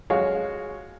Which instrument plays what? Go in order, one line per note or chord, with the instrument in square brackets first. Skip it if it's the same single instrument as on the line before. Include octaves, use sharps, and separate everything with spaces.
[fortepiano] G#3 F#4 C#5 F5